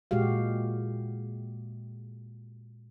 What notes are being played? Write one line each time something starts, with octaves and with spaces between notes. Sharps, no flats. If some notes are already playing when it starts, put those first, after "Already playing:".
A#2 G#3 F#4 G4 F5